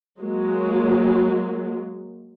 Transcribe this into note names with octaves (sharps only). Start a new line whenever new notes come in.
F#3 G#3 A#3